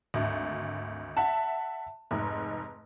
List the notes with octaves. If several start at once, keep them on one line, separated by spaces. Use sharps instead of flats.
G#1 D2
E5 F#5 A5
F1 G#2